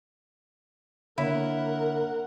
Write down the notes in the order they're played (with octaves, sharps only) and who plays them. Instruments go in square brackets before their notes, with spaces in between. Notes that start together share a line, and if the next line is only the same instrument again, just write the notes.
[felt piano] D3 A#3 C#5 [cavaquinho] E4 [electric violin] A#4 F#5